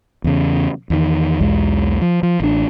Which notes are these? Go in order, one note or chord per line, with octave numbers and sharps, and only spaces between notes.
E2 C#3
E2 D#3
B1 E2 G#3
F3
F3
A1 D4